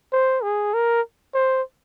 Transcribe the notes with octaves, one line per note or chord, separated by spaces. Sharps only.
C5
G#4
A#4
C5